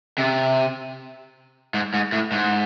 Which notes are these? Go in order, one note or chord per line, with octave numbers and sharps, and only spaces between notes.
C3
G#2
G#2
A2
G#2